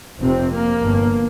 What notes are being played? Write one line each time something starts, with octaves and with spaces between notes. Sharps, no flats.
F1 F2 C3 C4
A#3
G1 G2